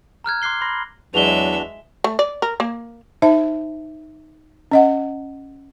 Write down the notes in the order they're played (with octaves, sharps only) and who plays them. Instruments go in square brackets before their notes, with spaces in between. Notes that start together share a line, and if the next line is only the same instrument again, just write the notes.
[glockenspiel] A#5 F6 F#6 G#6
C6 D6 F#6 C7 G7
B5 C6 A#6
[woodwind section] E2 F#3 [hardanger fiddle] G#3 E5 [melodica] D4 F#4 [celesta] F7 G7
[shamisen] A3
D5
A#4
A#3
[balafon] D#4 C5 E5 A5
C#4 D#5 F#5